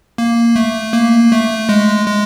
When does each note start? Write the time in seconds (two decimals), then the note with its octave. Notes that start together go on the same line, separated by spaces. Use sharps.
0.18 A#3
0.56 A3
0.93 A#3
1.32 A3
1.69 G#3
2.07 G#3